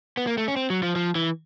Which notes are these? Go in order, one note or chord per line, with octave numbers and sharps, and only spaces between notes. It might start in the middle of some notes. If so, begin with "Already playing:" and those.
B3
A#3
A3
C#4
C4
F#3
F3
F3
E3